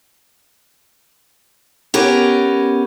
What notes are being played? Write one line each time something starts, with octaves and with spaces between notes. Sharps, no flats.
B3 C#4 G4 A#4